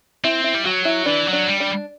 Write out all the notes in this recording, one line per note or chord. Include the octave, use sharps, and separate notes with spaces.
C4 E4
E4
G3
F#3 F#4
E4
E3 D4
F#3
D4
G3
D4